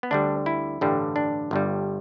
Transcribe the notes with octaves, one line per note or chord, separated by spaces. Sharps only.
B3
D2 D3 G3 D4
E4
A1 G2 D3 G3
D4
G1 G2 G3